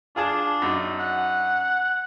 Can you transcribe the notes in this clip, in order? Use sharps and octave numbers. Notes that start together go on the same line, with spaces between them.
D4 F4 G#4 A5
F#2 D#4
F#5